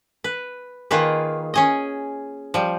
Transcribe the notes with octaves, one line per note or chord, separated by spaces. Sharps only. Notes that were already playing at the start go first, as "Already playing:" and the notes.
B4
D#3 A#3 F4 G#4 B4
C#4 G#4 D#5
F3 G3